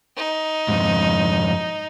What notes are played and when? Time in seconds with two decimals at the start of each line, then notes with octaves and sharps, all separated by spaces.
0.17 D#4
0.68 F2 G#2